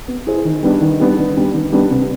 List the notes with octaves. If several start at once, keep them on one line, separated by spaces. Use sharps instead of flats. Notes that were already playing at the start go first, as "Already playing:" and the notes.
B3
E4 G#4 C5
D#3
G3 B3 D4
D#3
G3 B3 D4
D#3
G3 B3 D4
D#3
G3 B3 D4
C3